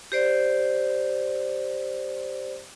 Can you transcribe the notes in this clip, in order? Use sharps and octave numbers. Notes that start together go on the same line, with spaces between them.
G4 C5 D5